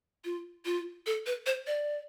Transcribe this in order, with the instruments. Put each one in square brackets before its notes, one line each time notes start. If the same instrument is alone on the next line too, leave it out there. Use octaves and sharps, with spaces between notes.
[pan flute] F4
F4
A4
B4
C5
D5